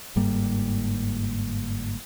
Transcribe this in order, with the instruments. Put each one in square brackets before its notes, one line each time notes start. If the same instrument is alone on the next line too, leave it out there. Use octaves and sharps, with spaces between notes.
[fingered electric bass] G1 G#2 G3 A#3